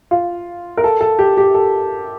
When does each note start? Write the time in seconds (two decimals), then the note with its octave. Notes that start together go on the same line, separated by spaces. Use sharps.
0.11 F4
0.77 A#4
0.84 A4
1.01 A4
1.19 G4
1.37 G4
1.54 A4